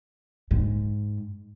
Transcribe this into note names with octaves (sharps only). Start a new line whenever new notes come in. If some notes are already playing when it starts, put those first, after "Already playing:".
G#2